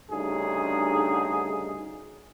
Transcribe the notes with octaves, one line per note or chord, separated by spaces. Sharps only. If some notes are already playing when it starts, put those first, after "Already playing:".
D2 G2 C#3 D#4 G#4